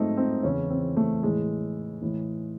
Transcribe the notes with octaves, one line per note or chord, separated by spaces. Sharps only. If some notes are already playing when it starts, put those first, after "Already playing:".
Already playing: G#2 F#3 A3 C4 D#4
C4
E2 C#3 E3 C#4
C4
A3
A2 E3 G#3
A2 E3